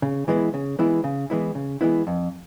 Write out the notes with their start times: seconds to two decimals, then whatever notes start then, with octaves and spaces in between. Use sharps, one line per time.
0.02 C#3
0.28 E3 G#3 B3 E4
0.54 C#3
0.79 E3 G#3 B3 E4
1.04 C#3
1.30 E3 G#3 B3 E4
1.55 C#3
1.81 E3 G#3 B3 E4
2.07 F2